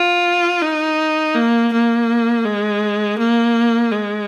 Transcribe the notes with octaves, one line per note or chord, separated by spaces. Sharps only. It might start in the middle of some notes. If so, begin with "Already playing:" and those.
Already playing: F4
D#4
A#3
A#3
G#3
A#3
G#3